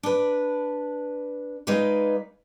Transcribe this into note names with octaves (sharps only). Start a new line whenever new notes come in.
D4 B4
G#3 D#4 F4 B4 D5